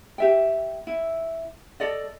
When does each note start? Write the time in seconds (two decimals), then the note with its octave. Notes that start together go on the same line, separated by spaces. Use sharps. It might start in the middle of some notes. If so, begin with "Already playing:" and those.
0.18 G4 E5 G5
0.87 E4
1.80 A4 D5 D#5